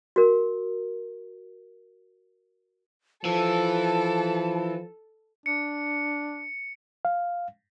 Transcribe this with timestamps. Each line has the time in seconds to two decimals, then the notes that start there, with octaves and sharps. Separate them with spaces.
0.16 F#4 A#4
3.25 E3 F3 A4 A5
5.46 D4 C#7
7.05 F5